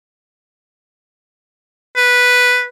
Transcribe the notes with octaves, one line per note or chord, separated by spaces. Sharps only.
B4